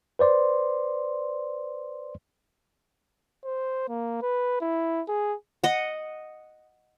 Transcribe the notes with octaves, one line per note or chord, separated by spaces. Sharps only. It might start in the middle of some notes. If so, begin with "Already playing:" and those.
B4 C5 D5 C6
C5
A#3
B4
E4
G#4
D#5 F#5